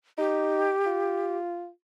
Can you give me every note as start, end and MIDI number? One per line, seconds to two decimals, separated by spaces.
0.18 0.71 63
0.18 1.37 67
0.86 1.69 65